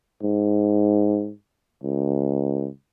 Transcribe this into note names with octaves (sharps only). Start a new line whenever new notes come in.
G#2
C#2